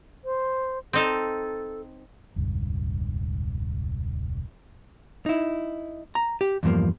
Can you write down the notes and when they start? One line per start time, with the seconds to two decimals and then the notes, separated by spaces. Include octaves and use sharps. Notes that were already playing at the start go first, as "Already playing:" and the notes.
0.25 C5
0.93 C4 D#4 A4 A5
2.36 E1 C#2 G2
5.26 D#4 E4
6.15 A#5
6.41 G4
6.63 E2 G2 F3 A#3